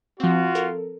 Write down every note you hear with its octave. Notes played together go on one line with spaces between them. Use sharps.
F3 C4 F4 F#4
A4 A#4